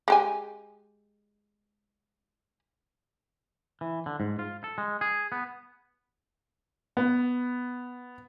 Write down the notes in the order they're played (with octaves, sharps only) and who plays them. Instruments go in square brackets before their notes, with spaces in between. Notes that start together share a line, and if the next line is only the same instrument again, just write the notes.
[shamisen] G#3 G4 G#5
[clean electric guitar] E3
D3
G#2
F4
A4
G#3
G#4
B3
[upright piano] B3